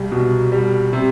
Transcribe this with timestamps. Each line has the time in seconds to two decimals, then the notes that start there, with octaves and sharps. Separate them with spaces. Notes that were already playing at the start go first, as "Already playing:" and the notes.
Already playing: C2 G3
0.12 B2
0.52 G3
0.93 C3